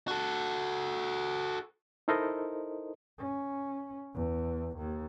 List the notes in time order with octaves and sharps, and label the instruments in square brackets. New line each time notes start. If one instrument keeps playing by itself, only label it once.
[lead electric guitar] F#4 A4
[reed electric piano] D#4 E4 A4 A#4 C5 D#5
[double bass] C#4
E2
D#2